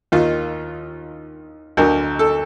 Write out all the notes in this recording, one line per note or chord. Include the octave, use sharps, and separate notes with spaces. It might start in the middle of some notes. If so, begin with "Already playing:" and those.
D#2 D#3 F4
D2 D3 A#4
A4